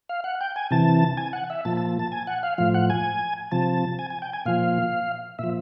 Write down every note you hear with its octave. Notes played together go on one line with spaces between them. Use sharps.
F5
F#5
G5
G#5
C3 E3 A5
G#5
F#5
E5
A#2 F3 A5
A5
A5
G#5
F#5
F5
A2 F3 F5
F#5
G#5
C3 F3 A5
G#5
G#5
G5
G#5
A#2 F3 F5
A#2 F3 E5